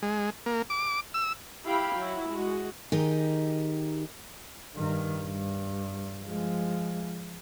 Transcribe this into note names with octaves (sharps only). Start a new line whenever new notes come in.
G#3
A#3
D6
E6
E4 G4 F5 G5 B5
F#3 E4 F#4
G#3 F#4
D#3 D#4 G4 G#4 D#5
G2 D#3
G2
F3 G#3